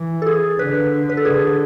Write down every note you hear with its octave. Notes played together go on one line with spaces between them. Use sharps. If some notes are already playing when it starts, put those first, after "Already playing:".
Already playing: E3
A4
G#4
D3 B4
B4
A4
D3 G#4